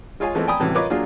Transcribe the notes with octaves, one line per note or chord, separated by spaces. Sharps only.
G#3 F4 G#4 C#5 F5 G#5
E3 F3 G#3 A3 B3 C4
D5 G5 G#5 A#5 B5 D#6
A2 C3 E3 F#3 G3 C#4
F4 A#4 B4 C#5 D#5 D6
F#3 A#3 D4 F4 G#4